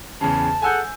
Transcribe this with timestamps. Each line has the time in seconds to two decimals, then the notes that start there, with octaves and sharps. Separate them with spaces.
0.21 E2 C#3 A5
0.62 G#4 A4 F#5 G#5 E6 G6